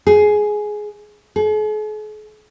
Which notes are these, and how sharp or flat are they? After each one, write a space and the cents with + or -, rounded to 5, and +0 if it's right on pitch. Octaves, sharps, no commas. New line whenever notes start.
G#4 +10
G#4 +45